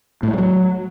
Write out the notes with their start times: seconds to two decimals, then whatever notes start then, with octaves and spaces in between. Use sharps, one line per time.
0.23 A2
0.28 A3
0.33 G#3
0.38 F#3